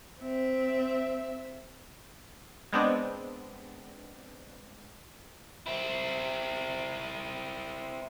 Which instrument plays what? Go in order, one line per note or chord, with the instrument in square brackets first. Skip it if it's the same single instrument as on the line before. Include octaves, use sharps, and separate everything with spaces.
[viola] C4 E5
[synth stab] G#3 B3 C4 D4
[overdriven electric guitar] C4 E4